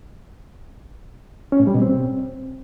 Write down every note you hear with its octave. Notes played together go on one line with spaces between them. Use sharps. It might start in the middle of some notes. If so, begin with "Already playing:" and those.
C#4
A2
G3
B2
C4